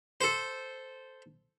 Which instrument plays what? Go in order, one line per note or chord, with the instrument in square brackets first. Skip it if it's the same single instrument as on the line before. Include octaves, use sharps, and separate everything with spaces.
[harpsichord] A4 C5